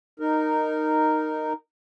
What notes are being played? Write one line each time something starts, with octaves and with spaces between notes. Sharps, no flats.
D#4 A#4